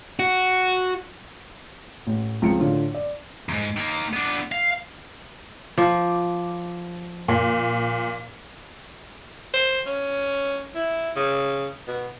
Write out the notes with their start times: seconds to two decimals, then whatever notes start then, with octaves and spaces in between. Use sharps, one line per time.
0.19 F#4
2.07 A1
2.42 C#2 F3 C4 C#7
2.60 A2 D3 F4
2.94 D5
3.49 E2 G#2
3.77 D#3 A#3
4.13 B3 D4
4.52 F5
5.78 F3 D6
7.28 A#2
9.54 C5
9.86 C#4
10.75 E4
11.16 C#3
11.88 B2